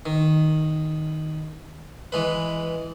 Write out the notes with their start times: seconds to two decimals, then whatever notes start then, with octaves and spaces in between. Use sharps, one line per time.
0.06 D#3
2.12 E3 G#3 B4